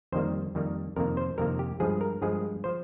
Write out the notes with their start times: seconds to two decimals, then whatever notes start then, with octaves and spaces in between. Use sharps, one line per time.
0.12 F2 D#3 G3 A#3 C5
0.55 F2 D#3 G3 A#3
0.96 F2 C3 D#3 A#3 A#4
1.17 C5
1.38 F2 C3 D#3 A#3 A#4
1.59 G4
1.80 G2 F3 G#3 G#4
2.01 A#4
2.22 G2 F3 G#3 G#4
2.64 F3 C5